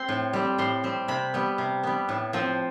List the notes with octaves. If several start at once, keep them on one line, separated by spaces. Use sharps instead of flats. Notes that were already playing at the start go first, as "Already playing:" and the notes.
Already playing: C4 C6
A2
G3 C4
A2 C6
G3 C4
C3 B5
G3 B3
C3
G3 B3
A2
F3 C4